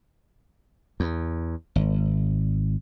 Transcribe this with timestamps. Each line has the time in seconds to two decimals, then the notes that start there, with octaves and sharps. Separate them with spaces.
1.00 E2
1.76 G#1